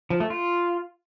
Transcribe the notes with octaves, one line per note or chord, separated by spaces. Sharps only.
F3
A3
F4